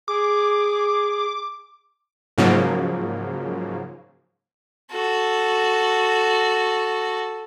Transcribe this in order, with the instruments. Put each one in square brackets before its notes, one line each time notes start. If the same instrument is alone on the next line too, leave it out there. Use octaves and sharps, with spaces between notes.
[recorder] G#4 [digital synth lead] D6
[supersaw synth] G#2 C#3 F3 F#3 A#3
[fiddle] F#4 A4